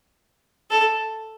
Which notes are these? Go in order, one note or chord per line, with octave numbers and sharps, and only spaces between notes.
A4